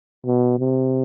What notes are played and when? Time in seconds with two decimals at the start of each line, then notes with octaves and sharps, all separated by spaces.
0.26 B2
0.59 C3